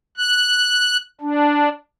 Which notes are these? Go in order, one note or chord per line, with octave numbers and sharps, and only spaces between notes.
F#6
D4